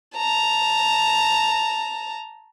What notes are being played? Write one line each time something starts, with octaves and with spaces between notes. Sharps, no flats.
A5 A#5